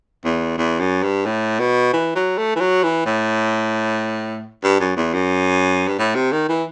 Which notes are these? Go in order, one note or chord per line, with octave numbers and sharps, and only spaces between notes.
E2
E2
F#2
G2
A2
B2
E3
F#3
A3
E3
F#3
E3
A2
G2
F#2
E2
F#2
G2
A2
C3
D#3
E3